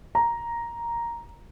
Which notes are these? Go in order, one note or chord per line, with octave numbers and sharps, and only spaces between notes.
A#5